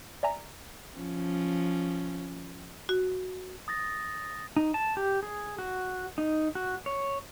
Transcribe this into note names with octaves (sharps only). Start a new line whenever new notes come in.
D5 E5 G#5 A#5
F3 C#4
F#4
D#6 A6 A#6
D#4
A5
G4
G#4
F#4
D#4
F#4
C#5